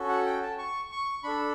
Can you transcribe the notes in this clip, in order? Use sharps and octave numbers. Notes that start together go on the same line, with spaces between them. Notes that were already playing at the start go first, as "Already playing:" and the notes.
Already playing: C#4 F#4 A4
F#5
G5
A5
C#6
C#6
D4 A4 B5